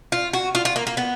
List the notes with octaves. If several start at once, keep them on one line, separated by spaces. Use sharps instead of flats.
F4
F#4
F4
F4
A#3
A#3
B3